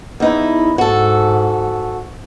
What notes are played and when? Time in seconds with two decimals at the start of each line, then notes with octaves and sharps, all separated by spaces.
0.20 E2 D#4 E4
0.78 G#2 F#4 A4